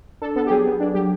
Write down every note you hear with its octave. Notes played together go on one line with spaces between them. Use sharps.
D4 A4
B3 A4
G4
F#3 G#4
B3
D4
F#3 G4